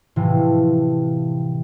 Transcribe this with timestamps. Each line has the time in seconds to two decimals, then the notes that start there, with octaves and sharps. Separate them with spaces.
0.16 A2 C3 E3 F3